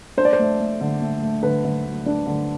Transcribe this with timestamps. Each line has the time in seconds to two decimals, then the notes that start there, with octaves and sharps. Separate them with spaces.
0.17 D4 C5
0.25 D5
0.33 C5
0.39 A3
0.59 A3
0.81 D3
1.01 A3
1.22 A3
1.43 D3 B4
1.64 D3
1.85 D2
2.06 D4
2.27 D3